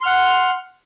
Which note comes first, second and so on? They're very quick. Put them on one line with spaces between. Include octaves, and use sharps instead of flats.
C6 F6 F#5